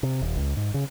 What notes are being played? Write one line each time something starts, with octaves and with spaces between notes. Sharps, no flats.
C3
D#1
C#2
G#2
C#3